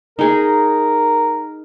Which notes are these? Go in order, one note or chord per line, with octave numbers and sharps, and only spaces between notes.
D#4 G#4 A#4